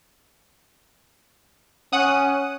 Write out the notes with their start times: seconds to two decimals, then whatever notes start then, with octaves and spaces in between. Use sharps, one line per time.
1.93 C#4 F#5 D#6